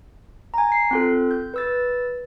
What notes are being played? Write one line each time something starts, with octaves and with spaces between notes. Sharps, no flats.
G#5 A#5
C7
C4 F4 A4
G6
B4 E6 A6